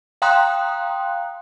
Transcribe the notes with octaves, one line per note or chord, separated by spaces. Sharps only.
F5 G5 A#5 C6 D#6 F#6